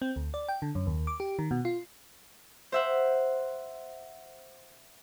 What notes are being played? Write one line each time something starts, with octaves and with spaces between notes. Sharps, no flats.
C4
D2
D5
G5
D3
F#2
D#2
D6
G4
D#3
B2
F4
C5 E5 F#5